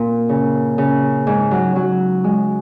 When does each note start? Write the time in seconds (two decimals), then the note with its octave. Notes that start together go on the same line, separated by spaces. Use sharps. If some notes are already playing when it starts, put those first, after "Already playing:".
Already playing: A#2
0.29 C#3
0.78 C#3
1.27 G#2
1.51 F#3
1.76 F#3
2.24 G#3